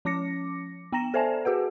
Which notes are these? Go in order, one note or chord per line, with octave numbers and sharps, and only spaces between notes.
F3 C#4 D6 A#6 C#7
B3 G5 A#5 A#6 E7
A4 C5 D5 E5 G#5 A5
F#4 G#4 B4 F#5